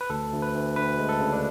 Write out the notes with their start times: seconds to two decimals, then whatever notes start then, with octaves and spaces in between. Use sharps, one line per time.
0.01 B4
0.10 D2 A4
0.32 D2
0.42 B4
0.55 D2
0.76 D2 B4
0.98 G#3
1.09 A4
1.20 C#3
1.33 D4